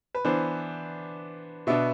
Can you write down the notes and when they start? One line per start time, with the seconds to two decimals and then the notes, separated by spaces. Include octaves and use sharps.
0.15 B4
0.25 E3 B3 D4 C5
1.67 B2 B3 D4 E5